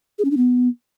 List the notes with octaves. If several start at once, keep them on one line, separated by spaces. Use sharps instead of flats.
G#4
C#4
D4
B3